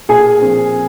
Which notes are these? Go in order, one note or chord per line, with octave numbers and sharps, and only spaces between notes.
A#2 G#4 G#5
F3 C4